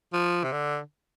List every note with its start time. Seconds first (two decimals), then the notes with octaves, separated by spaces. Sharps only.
0.13 F3
0.44 C3
0.52 D3